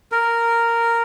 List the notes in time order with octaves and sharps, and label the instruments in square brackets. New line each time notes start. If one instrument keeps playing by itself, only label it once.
[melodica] A#4